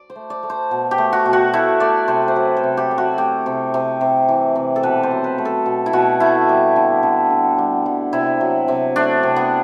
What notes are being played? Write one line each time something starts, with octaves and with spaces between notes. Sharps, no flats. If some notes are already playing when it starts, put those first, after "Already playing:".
Already playing: D5
C5
A3
D5
A3
C5
B2
G4
A3
F#4
B2
F#4
A3 E4
A3 D5
C3 C5
C5
F#3 B4
A4
C3
G4
A3
F#4
A3 G4
C3
C3
C3
E3
C3
A4
B2 B4
C5
F#3
B4
A3
A4
B2
E4
B2 F#4
A3 E4
G3
D3
D3
D3
G3
G3
C3 E4
F#3
C3
A3 D4
C3
B3